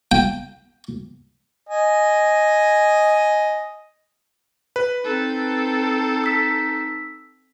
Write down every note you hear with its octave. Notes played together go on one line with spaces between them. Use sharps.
G5
D#5 G#5
B4
C4 D#4 A4
E6 B6